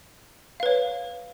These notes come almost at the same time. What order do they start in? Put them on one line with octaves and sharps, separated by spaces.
F5 B4 C#5